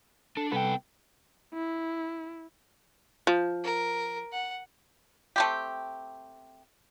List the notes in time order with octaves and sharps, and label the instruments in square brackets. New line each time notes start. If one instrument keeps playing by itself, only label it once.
[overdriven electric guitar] D4 [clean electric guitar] A4
[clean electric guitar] C2 A4 B4 [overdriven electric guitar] B3 G5
[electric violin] E4
[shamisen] F3
[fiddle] A#4
F#5
[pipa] A3 C4 G4